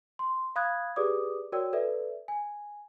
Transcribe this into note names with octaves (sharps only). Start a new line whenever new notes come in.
C6
F5 B5 D#6 F#6 G#6
G4 G#4 B4 D5 D6 D#6
F#4 A#4 C#5 D5 G5 E6
A4 B4 D5 E5
G#5